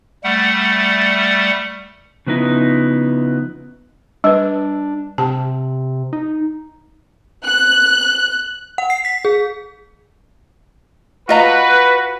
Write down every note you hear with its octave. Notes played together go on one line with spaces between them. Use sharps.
G3 A3 F#5
C#3 F3 B3 C4 D#4 E4
G3 D4 B4
C3 G4 A5
D#4
F#6
F#5
C7
B6
G#4
F4 F#4 B4 D#5 A#5